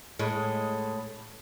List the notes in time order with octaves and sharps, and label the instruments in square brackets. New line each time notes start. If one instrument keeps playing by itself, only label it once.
[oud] A2 G#3